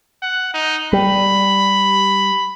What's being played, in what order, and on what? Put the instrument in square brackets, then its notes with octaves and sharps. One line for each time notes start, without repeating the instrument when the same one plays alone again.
[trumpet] F#5
D#4
[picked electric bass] G3 [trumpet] B5